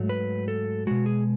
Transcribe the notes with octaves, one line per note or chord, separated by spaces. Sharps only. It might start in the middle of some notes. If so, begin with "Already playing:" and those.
Already playing: G#2 F#3 A3
B4
A4
B2 G#3 F#4
G#4